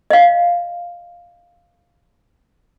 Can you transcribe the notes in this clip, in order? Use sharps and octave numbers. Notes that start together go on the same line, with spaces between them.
D#5 F5